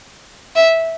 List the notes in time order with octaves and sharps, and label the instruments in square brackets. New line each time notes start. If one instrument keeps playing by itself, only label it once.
[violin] E5